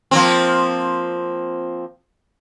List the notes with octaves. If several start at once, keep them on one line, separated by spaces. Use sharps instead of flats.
F3 A#3 C4